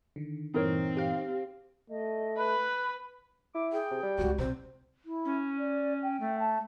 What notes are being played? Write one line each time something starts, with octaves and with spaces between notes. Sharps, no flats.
D3 D#3
G2 A#2 E3 C4 D#4 A#4 C#5
G4 F5
A3 D#5
B4 B5 F#6
E4 D6
G#4 G5
C3
G3
C#2 C4 F#4
C3 C5
E4
C#4
D5
G5
A3
A5